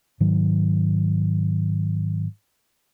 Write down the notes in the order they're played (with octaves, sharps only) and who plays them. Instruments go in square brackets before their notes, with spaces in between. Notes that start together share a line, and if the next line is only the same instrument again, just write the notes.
[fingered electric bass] G#2 D#3 F#3